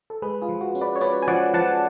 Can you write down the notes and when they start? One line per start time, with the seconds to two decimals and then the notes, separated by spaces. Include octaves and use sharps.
0.10 A4
0.22 G#3 G#4 B4
0.41 F4 G#4
0.49 F3
0.61 F#4
0.75 C#4
0.81 B4 D5
0.96 C#5
1.01 C#4 B4 D5
1.22 G#5
1.28 F3 D5 F#5
1.54 F3 F#5 A5